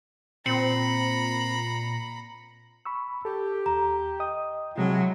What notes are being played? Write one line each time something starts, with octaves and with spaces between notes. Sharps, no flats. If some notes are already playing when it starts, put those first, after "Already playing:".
A#2 C4 A#5 B5 C7 C#7 F#7
B5 C#6 E6
G4 A4
D#2 A#5
D#5 G5 D#6
A2 C3 F#3 G#3